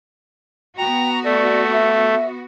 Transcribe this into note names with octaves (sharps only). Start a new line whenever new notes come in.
B3 F#4 G5 A#5
A3 D5
E5